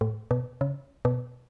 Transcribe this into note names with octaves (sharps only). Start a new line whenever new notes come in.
A2
B2
C#3
B2